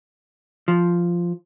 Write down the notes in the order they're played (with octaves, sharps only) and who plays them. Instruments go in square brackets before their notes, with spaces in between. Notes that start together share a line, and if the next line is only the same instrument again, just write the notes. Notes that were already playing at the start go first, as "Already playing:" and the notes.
[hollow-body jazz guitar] F3